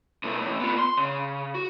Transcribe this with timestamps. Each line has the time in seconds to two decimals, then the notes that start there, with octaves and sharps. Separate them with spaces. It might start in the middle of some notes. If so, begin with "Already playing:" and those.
0.24 B2 A3
0.42 A2 E3
0.60 B3 F4
0.78 C6
0.97 C#3
1.55 F#4